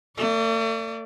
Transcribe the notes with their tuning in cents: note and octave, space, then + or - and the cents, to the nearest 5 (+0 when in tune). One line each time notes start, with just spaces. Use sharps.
A3 +45 D5 +0